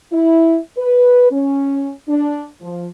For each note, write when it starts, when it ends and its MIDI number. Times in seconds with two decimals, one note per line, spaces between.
0.12 0.58 64
0.77 1.29 71
1.31 1.91 61
2.08 2.46 62
2.60 2.87 53